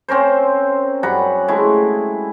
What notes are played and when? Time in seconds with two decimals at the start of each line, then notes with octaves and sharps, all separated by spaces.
0.08 C4 C#4 A#4 C5
1.03 F#2 G3 F#5 A#5
1.48 G#3 A3 E4